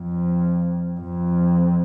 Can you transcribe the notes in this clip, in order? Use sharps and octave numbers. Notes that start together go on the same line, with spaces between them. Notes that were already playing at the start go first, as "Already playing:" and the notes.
Already playing: F2
F2